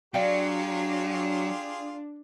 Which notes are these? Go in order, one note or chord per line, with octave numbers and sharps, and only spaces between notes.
F#3 D4 F4 G4 G#4 D5 F5 G5